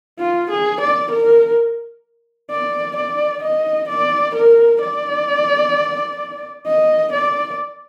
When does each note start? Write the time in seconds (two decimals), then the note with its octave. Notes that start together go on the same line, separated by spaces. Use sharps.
0.19 F4
0.50 G#4
0.81 D5
1.12 A#4
2.50 D5
2.96 D5
3.42 D#5
3.89 D5
4.35 A#4
4.81 D5
6.66 D#5
7.12 D5